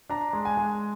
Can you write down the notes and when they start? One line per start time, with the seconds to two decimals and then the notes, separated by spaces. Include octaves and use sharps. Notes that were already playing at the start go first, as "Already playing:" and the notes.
0.09 D4 A#5
0.33 G#3
0.45 G#5
0.57 G#3